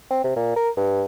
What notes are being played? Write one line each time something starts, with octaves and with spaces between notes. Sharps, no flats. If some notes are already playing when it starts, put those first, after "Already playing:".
C4
C3
A#2
A#4
G2